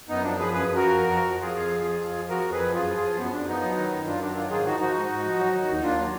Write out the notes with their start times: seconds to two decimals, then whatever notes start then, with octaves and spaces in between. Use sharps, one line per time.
0.09 F#2 B3 D#4
0.23 F3 D4
0.38 F3 G#4 B4
0.54 F#2 G#4 B4
0.68 F#2
0.75 F#4 A#4
0.82 F3
0.97 F2
1.12 F3
1.27 F3
1.41 F2 F4 G#4
1.57 F2
1.70 F3
1.85 F2
2.01 F3
2.15 F3
2.29 F2 F#4 A#4
2.45 F2
2.52 G#4 B4
2.60 F3
2.74 F#2 F4 G#4
2.89 F3
2.96 F4 G#4
3.04 F3
3.18 F#2 B3
3.33 F#2 D4
3.47 F3 B3 D#4
3.62 F#3
3.77 D#3
3.91 F#2
4.06 F#2 D4 F4
4.21 F#3 D4
4.36 D#3 D4 F4
4.50 G#2 F4 G#4
4.66 F3 D#4 F#4
4.80 F3 D#4 F#4
4.95 G#2
5.10 G#2
5.25 F3
5.39 F#3
5.54 D#3
5.68 D#2 D#4
5.83 D#2 D4 F4
5.98 F#3